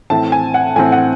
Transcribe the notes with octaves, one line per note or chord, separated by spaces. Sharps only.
A2 E3 C4 A5
G#5
F#5
A2 E3 C4 G#5
F#5